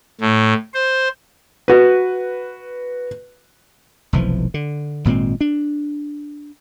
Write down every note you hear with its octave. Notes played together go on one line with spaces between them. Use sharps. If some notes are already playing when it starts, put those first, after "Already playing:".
A2
C5
F#4 B4
F1 B1 E3 F3
D3
G#1 A#2 G#3 C4
D4